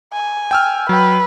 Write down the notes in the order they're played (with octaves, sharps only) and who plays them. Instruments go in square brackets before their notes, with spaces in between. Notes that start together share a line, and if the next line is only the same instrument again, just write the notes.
[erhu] G#5
[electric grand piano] G5 E6 F6
[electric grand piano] F#3 G5 [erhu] B4